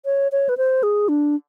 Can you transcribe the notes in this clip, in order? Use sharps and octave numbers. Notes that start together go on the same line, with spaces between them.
C#5
C#5
B4
C5
G#4
D4